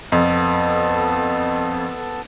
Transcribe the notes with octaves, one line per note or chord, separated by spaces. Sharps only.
F2 B3 A4 A5